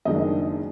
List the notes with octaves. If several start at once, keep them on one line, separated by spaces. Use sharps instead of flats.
F#1 F#2 D#3 G#3 D4 D#5